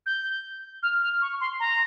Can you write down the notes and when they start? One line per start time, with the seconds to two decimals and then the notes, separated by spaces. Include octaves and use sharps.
0.06 G6
0.83 F6
1.03 F6
1.22 C#6
1.41 C6
1.60 A#5